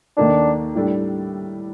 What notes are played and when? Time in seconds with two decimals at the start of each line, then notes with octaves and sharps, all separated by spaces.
0.17 D#2 D#3 A#3 D4 D#4 A4
0.75 A2 G3 D4 A4